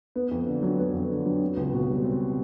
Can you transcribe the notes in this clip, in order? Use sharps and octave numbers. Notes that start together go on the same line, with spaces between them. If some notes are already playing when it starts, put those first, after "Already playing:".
B3
F2
D3
F#3
B3
F2
D3
F#3
C4
C#2
B2
G3
C4